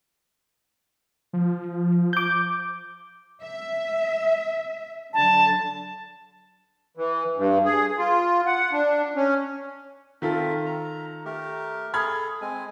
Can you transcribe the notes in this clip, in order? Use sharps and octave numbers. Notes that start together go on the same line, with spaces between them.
F3
D6 G6
E5
D3 F#3 A5
E3
G2
G#4
F4
F#5
D4
C#4
D#3 C4 F4 A4 A#4 E5
A#5
A3 G4 A#4
G#4 A4 B5 F6 G#6
G#3 C4 G#5